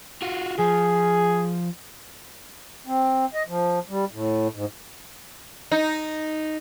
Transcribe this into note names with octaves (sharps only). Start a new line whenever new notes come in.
F4 F#4
F3 G#4
C4
D#5
F3
G3
A2
G#2
D#4